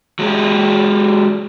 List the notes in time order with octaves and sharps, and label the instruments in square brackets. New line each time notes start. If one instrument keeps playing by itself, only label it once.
[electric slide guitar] F#3 G#3 G4 G#4